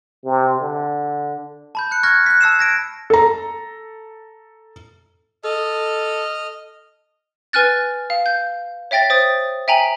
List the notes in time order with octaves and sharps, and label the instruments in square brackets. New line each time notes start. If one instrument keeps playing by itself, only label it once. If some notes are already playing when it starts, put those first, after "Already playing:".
[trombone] C3
D3
[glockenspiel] A5 B5 G6
F#6 C#7
C#6 F6 F#6 G#6 A#6
F#6 B6
A5 E6 C7 E7
G#6 A#6 D7
[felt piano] A4 A#5
[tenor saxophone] A4 [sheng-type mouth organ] D#5 F6
[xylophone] B4 G#5 F6 F#6 A6
F5
G6
C#5 E5 G5 A6 A#6
C5 D#6 A6
E5 G5 G#5 A#5 F#7